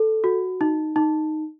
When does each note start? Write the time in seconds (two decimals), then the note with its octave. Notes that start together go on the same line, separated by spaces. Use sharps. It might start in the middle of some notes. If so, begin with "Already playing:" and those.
Already playing: A4
0.24 F#4
0.61 D#4
0.96 D#4